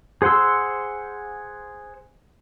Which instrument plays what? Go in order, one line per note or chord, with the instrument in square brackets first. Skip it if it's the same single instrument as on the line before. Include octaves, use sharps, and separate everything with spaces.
[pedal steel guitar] G#4 C5 F#5 C6 E6